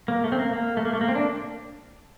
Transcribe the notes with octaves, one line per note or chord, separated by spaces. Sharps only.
A#3
A3
C4
A#3
A#3
A3
A#3
A3
A#3
C4
D4